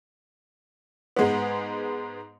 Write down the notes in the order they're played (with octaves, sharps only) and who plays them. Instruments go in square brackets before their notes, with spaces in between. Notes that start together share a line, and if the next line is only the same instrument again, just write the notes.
[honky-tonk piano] G#2 G#3 B3